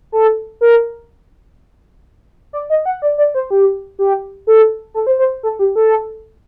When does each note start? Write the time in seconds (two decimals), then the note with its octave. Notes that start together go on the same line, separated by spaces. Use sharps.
0.12 A4
0.61 A#4
2.53 D5
2.70 D#5
2.86 F#5
3.02 D5
3.18 D5
3.35 C5
3.51 G4
3.99 G4
4.47 A4
4.94 A4
5.07 C5
5.19 C5
5.43 A4
5.59 G4
5.76 A4